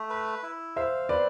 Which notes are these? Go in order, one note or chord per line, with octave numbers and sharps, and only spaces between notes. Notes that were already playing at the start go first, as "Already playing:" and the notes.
Already playing: A3
B4
E4
C5 E5 F5
C4 B4 D5